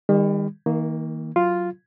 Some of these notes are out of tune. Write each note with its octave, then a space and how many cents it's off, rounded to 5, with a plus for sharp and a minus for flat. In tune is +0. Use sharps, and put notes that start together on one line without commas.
D#3 +0 G3 +40
D#3 +40 A#3 +0
F#3 +0 F4 +0